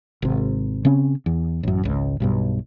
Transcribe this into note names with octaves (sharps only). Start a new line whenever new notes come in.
G#1 C3
C#3 C4 C#4
E2
A1 F#2
G#1 C#2
B1 G2 B2